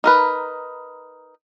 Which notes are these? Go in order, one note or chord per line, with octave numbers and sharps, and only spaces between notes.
D#4 A#4 B4